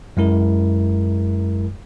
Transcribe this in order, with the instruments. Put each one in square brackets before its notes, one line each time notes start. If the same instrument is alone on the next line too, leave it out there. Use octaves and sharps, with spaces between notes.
[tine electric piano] F#2 G#3 E4 A#4